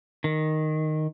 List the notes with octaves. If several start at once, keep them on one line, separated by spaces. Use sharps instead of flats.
D#3